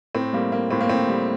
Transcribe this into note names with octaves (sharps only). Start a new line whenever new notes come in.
A2 C4
G3 A#3
A#3
A2 C4
A#3
A2 C4
G3